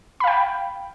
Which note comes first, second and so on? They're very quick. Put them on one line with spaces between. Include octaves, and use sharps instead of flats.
B5 F5 G5